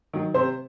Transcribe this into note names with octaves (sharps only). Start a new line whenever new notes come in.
D#3 F#3
C3 C4 C5